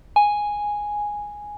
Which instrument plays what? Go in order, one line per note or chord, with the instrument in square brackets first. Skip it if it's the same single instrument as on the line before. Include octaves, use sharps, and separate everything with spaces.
[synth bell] G#5